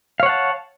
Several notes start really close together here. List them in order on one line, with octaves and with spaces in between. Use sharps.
F5 C#5 F#5 A5